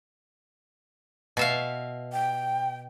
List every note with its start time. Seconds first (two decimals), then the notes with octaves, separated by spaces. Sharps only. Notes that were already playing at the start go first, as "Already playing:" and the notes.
1.37 B2 E5 F5
2.13 G5